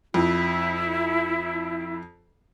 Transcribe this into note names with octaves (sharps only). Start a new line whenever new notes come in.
F2 E4